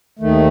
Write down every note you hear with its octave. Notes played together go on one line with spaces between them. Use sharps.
D#2 D#3 A3